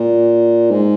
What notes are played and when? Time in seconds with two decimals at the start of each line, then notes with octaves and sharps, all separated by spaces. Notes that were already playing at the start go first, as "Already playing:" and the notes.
Already playing: A#2
0.71 G#2